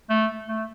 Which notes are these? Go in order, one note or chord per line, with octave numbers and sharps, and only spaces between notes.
A3
A3